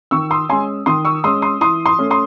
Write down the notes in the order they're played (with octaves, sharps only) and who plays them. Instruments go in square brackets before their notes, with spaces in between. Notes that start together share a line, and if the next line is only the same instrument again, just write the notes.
[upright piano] D#3 C#6 E6
C6 D#6
G#3 C#4 G#5 C6
D#3 C6 D#6
C#6 E6
G#3 C#4 C6 D#6
C6 D#6
E3 C6 D#6
C6 D#6
A3 C#4
C6 D#6